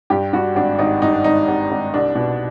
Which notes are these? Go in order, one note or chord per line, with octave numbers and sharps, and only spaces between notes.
G2 G4
G2 F#4
G#1 D4
G#1 D#4
G2 D#4
D4
G#1 D#4
G#1
G#1
C2 D4
B2